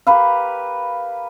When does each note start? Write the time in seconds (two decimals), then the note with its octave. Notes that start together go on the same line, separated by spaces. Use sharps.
0.07 G4 A#4 B4 F5